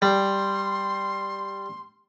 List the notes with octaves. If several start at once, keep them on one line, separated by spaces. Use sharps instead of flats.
G3 C6